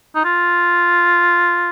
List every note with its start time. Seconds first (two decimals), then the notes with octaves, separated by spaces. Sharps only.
0.15 D#4
0.25 F4